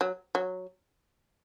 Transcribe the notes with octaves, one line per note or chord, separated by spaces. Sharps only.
F#3
F#3